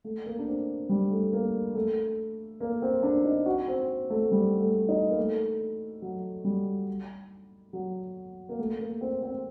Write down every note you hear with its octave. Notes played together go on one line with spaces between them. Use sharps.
A3
A#3
D4
C4
G3
A3
A#3
A3
A#3
C4
D4
D#4
F#4
C4
A3
G3
A3
D#4
A#3
A3
F#3
G3
F#3
A#3
A3
A#3
C4
C4